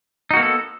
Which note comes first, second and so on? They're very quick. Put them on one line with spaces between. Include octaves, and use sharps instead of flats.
D#4 F#4 A#3 B3 A4